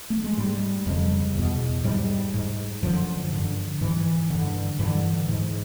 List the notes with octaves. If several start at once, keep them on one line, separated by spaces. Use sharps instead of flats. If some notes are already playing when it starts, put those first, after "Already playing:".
A3
G#3
G#2 G3
F2 C#3 G3
E2 B2
G#2 G3
G#2
F#2 D3 F3
G2 D3
G#2 E3
G2 D3
G2 D3 E3
G#2